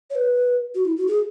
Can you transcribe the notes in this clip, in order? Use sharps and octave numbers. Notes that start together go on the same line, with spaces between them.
C#5
B4
F#4
E4
F#4
G#4